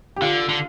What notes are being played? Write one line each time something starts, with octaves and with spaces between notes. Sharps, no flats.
G4
D3 F4
D3